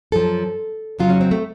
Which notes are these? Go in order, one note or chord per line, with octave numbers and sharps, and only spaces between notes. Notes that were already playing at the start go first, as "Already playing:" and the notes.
F#2 F3 A4
F2 C#3 F#3 F4
C#4
C4
A3